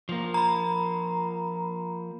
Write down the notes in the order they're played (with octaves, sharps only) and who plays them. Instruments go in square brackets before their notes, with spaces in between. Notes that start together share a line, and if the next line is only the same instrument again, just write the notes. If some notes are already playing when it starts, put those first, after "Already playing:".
[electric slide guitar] F3 A#3
[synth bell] A#5 B5